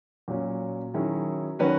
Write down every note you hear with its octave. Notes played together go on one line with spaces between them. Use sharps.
A#2 F#3 C#4
D#3 F#3 C#4 E4 G#4
D#3 F#3 C#4 F#4 B4